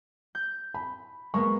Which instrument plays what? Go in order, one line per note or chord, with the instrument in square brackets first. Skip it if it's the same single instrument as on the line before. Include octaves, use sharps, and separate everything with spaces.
[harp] G6
[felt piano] B5
[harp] G#3 A#3 B3 [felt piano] C#6